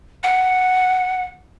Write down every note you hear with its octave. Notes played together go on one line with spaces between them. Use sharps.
F#5